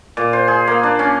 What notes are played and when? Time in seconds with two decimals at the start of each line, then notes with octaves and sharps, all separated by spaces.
0.17 A#2
0.33 C5
0.48 G#4
0.68 A#3
0.83 D4
0.99 C#4